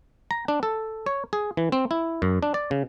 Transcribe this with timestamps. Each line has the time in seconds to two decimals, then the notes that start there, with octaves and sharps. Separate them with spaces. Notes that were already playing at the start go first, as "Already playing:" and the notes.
0.31 A#5
0.48 D4
0.63 A4
1.06 C#5
1.33 G#4
1.57 E3
1.72 C4
1.91 E4
2.22 F#2
2.43 D4
2.54 D5
2.71 C#3